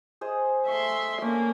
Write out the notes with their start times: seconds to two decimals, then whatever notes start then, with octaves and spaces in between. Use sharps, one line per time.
0.21 G#4 C5 D#5
0.68 A3 E5 G#5 C6 C#6
1.22 A#3 C#4 D4 G5